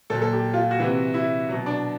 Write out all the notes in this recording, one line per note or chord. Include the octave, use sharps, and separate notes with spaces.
A#2 F#3 A4
A4
G4
F4
F#4
C3 E3
E4
B2 F#3
D4